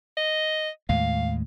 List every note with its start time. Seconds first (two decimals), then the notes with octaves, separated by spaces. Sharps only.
0.17 D#5
0.89 D#2 A2 G#3 F5